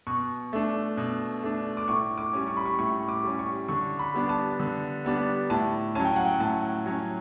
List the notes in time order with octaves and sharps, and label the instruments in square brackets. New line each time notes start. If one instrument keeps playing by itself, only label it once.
[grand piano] B2 C#6
A3 D4
B2
A3 D4
D6
A2 C#6
D6
G3 C#4
C#6
B5
C#6
A2 C#6
D6
G3 C#4
C#6
D3 C#6
B5
G3 B3 D4
A5
D3
G3 B3 D4
A2 A5
F#3 C#4 A5
G5
F#5
G5
A2 A5
F#3 C#4